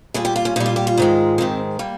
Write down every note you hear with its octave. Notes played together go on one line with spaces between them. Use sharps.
A#2 G3 G#4
G4
F4
C#4
A#2 G3 D#4
F4
G4
F4
G#2 D#3 G#3
G#2 D#3 G#3 C4
G3 A#3